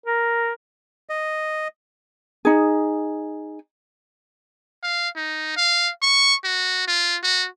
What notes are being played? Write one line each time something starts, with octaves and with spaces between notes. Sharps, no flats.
A#4
D#5
D#4 G#4
F5
D#4
F5
C#6
F#4
F4
F#4